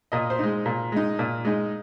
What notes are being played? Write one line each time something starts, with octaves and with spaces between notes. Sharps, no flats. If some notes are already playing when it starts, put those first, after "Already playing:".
A#2 D#5
C5
G#3 D#4
A#2
G#3 D#4
A#2
G#3 D#4